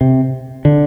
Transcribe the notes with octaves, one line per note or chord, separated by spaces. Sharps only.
C3
D3